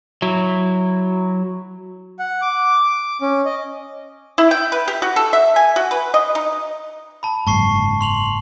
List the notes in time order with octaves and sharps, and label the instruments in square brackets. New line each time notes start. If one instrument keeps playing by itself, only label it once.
[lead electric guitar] F#3 E4
[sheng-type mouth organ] F#5
D6
C#4
D#5
[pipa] E4
G5
B4
G4
F#4
A4
E5
G#5
F#4
B4
D#5
D#4
[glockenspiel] A5 B5
[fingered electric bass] F#1 G#2 [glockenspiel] A5 C#6 C7
[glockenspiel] C6 F7 F#7